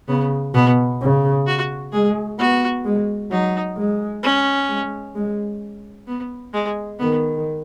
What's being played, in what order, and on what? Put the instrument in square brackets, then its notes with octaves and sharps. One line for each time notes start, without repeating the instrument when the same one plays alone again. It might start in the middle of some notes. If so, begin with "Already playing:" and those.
[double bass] C#3 [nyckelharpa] B3
[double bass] B2 [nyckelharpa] B3
[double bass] C#3
[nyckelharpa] F#4
[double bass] G#3 [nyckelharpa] G#4
[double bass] B3 [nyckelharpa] F#4
[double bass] G#3
[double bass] F#3 [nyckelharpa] D#4
[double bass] G#3
[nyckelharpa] C#4
[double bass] G#3
G#3
[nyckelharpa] B3
G#3
[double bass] D#3 [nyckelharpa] B3